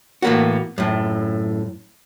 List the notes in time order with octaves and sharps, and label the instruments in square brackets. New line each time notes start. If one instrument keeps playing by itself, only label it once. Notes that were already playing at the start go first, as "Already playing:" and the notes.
[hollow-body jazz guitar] A2 E3 A#3 B3 F#4
F#2 A2